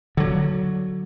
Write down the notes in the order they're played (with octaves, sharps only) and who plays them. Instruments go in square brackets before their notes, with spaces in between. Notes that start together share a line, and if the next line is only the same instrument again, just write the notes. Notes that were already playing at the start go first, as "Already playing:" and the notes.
[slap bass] D3 F#3